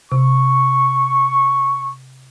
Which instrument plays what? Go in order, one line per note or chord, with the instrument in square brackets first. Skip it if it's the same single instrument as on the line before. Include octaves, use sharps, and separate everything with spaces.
[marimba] C3 [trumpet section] C#6